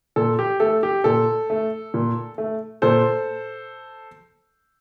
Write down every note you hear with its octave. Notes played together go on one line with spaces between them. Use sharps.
A#2 A4
G4
A3 A4
G4
A#2 A4
A3
A#2
A3
A#2 A4 C5